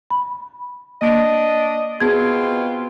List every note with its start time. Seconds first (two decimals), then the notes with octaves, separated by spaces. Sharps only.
0.10 B5
1.02 A#3 D4 D#5
2.00 B2 B3 C4 F4 G#4 G#6